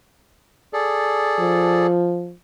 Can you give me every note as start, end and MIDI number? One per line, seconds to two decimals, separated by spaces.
0.73 1.87 68
0.73 1.87 69
0.73 1.87 74
1.40 2.33 53